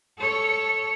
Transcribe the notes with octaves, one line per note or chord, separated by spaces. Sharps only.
A4 C#5